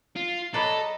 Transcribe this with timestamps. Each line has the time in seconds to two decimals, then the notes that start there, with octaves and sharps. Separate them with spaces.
0.16 F4 C7
0.54 F#3 A4 B4 D5 D#5 A#5